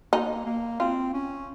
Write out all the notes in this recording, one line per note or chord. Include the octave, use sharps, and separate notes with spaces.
A#3 D#4
A#3
C4 F4
C#4